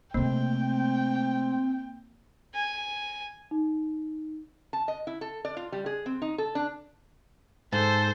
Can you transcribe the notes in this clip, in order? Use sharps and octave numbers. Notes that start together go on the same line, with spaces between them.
C3 A3 A#3 C4 G5
G#5
D#4
A5
D#5
E4
A4
D5
F4
G3
G#4
C4
D#4
A4
D4
G#2 A4 C5 A5